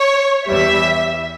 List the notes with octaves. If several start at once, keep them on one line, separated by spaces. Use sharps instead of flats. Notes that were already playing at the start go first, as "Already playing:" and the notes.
Already playing: C#5
E2 E3 G3 E5